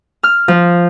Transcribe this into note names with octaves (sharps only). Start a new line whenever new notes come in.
F6
F3